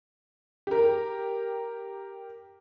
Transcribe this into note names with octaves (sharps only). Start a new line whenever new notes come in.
G4 A#4